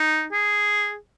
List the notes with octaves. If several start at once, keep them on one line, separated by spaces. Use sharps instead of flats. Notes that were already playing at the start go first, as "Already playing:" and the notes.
Already playing: D#4
G#4